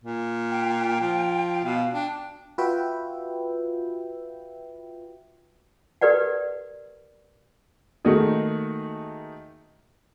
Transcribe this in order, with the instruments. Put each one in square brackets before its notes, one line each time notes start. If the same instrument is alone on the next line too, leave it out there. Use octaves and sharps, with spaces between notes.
[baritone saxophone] A#2
[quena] G5
[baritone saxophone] F3
[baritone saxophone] B2 [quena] F5
[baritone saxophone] D4 [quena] G5
[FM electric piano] F4 F#4 B4 E5 G5
[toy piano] G4 A#4 B4 D5 F#5
[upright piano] D#3 A3 A#3 D#4 F#4 G#4